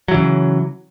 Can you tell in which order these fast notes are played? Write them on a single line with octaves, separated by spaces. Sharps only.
F#3 E3 C#3